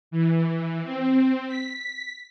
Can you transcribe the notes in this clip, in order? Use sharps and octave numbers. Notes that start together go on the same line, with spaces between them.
E3
C4
B6